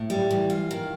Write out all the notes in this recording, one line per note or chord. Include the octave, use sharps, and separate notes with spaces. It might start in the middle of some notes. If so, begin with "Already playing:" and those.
Already playing: A2
G3
E3
F4
D#3